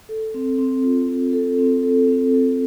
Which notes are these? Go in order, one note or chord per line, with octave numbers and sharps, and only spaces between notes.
A4
C4
C4
F4
C4
A4
C4
A4
C4
A4